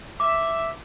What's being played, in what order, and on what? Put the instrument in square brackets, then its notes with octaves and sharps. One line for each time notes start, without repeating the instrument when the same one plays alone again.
[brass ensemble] E5 [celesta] D6